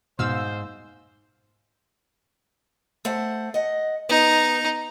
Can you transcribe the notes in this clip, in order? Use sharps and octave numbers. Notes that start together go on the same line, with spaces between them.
G#2 B2 C5 F5 E6
A3 C5 F#5
D#5 F#5
B3 D#4